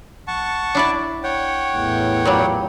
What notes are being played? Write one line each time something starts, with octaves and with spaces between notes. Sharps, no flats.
A#1 F#5 A5 C#6
D4 E4 D5
C#5 F#5 G5
E2 A2
A#2 F#3 G3